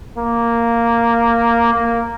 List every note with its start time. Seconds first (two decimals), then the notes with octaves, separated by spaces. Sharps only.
0.17 A#3
1.74 A#3